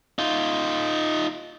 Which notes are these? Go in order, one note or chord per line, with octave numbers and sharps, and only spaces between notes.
D#4 F4